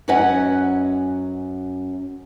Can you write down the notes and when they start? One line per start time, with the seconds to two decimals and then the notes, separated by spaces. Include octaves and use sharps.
0.08 F#2 C#4 B4 D#5 F#5 G#5